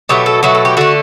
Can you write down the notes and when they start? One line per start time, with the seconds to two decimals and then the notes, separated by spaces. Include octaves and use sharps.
0.09 B2 F#3 A3 G4
0.26 A4
0.43 B2 F#3 A3 F#4
0.55 A4
0.65 G4
0.77 D3 A3 F#4